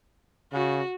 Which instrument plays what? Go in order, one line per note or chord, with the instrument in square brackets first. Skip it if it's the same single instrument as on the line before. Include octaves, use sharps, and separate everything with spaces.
[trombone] C#3 [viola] F#4